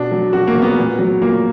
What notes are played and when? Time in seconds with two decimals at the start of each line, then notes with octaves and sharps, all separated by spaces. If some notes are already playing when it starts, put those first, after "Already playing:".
Already playing: B2 D4
0.12 F#3
0.33 B2 F#4
0.47 A#3
0.56 F#3
0.62 B3
0.78 A#2
0.99 F#3
1.21 A#2 A#3